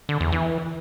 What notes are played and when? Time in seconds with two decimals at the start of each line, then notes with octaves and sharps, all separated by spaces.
0.09 D3
0.21 E2
0.32 E3